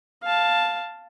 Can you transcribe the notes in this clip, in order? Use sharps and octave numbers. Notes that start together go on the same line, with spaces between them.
F5 A5